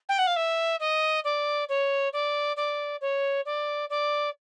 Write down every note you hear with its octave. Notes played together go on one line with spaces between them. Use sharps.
G5
F#5
F5
E5
D#5
D5
C#5
D5
D5
C#5
D5
D5